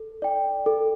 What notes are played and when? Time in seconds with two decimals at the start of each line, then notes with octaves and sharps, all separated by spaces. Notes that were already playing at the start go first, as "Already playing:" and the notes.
Already playing: A4
0.22 D5 G5
0.66 A4